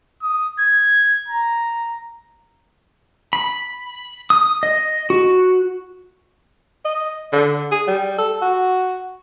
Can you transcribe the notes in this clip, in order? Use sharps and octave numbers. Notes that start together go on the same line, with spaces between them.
D#6
G#6
A#5
B5
D#6
D#5
F#4
D#5
D3
G#4
G3
A4
F#4